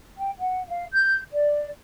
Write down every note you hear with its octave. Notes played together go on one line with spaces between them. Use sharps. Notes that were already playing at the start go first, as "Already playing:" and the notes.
G5
F#5
F5
G6
D5